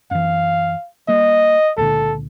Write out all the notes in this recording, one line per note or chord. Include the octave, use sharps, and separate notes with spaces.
F#2 E3 F5
G3 A#3 D#5
C#2 A#2 D3 A4